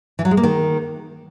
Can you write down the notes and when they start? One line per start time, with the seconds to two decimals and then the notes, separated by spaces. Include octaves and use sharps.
0.19 E3
0.25 F#3
0.31 G#3
0.37 A#3
0.43 D#3